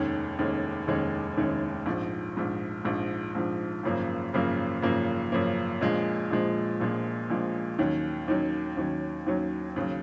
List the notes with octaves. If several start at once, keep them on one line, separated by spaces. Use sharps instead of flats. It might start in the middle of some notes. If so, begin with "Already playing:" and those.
Already playing: F1 D#2 D#3 G#3 C#4
F1 D#2 D#3 G#3 C#4
F1 D#2 D#3 G#3 C#4
F1 D#2 D#3 G#3 C#4
A#1 G#2 F3
A#1 G#2 F3
A#1 G#2 F3
A#1 G#2 F3
G#1 F#2 C#3 F3 A#3
G#1 F#2 C#3 F3 A#3
G#1 F#2 C#3 F3 A#3
G#1 F#2 C#3 F3 A#3
A#1 A#2 F3 G#3
A#1 A#2 F3 G#3
A#1 A#2 F3 G#3
A#1 A#2 F3 G#3
D#2 D#3 F#3 C#4
D#2 D#3 F#3 C#4
D#2 D#3 F#3 C#4
D#2 D#3 F#3 C#4
D#2 C#3 F#3